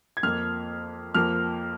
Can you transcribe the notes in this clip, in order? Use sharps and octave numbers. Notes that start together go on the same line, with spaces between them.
G#6
F2 F3 A#3 F6
F2 F3 A#3 F6